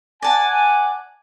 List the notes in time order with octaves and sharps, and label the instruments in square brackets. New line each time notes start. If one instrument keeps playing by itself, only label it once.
[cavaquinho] D5 A5 [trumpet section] F#5 G#5